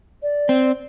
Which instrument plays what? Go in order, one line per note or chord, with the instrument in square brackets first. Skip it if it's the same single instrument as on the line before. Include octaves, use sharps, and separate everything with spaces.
[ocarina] D5
[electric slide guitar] C4